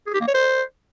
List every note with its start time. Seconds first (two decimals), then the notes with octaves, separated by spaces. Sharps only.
0.07 G#4
0.14 G4
0.20 A#3
0.27 C#5
0.34 C5